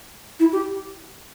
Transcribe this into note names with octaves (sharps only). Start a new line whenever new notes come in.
E4
G4